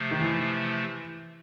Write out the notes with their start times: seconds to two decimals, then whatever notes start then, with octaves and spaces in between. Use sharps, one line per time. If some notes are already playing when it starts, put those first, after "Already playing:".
Already playing: C3 F3 A3
0.11 D#3
0.21 E3